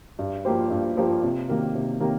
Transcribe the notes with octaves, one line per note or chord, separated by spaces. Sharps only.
G2
F3 A#3 G4 C5
G2
F3 A#3 G4 C5
C3
D#3 A#3 G4 A#4
C3
D#3 A#3 G4 A#4